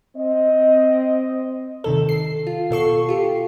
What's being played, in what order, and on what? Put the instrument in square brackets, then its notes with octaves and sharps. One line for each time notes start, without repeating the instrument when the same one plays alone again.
[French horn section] C4 D#5
[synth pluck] C3 D#3 A4
C7
F4
B2 A4 C#6 C7
F4 G4